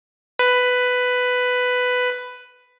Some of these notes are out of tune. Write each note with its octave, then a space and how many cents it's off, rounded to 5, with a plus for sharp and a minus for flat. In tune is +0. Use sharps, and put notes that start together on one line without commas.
B4 +10